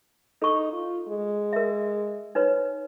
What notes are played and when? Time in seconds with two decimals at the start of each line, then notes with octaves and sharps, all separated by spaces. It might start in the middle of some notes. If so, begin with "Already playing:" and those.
0.42 D#4 A4 C#6
0.72 F4
1.08 G#3
1.53 A#4 E5
2.35 D#4 B4 C#5